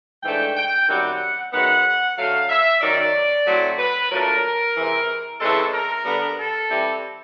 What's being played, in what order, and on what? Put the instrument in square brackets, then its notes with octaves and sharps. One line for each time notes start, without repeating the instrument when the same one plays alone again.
[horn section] G#2 E3 A3 D4 G5
G5
F#2 D#3 G3 C4 F#5
F#2 D#3 G#3 B3 F#5
D3 F#3 A3 F5
E5
F#2 D#3 F#3 D5
A2 F#3 A3 C4
B4
A#2 F#3 A3 D4 A#4
C3 E3 G#3
C#3 E3 G#3 C4 A4
A#4
D3 G3 B3 D4
A4
E3 G3 C4